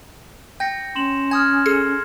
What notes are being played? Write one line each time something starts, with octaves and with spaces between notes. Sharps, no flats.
G5 G6 A#6 C#7
C#4 C6 E7 F#7
G#5 D#6 F6 G#6
G#4 A4 C#7